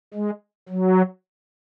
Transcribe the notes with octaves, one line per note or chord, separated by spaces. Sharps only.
G#3
F#3